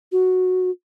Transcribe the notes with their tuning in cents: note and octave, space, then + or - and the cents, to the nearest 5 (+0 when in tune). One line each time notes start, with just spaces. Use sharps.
F#4 -5